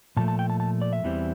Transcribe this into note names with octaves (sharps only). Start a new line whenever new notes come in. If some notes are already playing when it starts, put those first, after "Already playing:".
A#2 F3 A3 A5
A5
G5
A5
A5
D5
E5
E2 E3 G3 C4